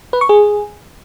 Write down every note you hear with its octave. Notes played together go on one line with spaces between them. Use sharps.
B4
C#6
G#4